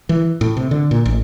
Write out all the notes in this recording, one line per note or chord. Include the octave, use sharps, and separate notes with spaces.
E3
A2
C3
D3
A#2
A1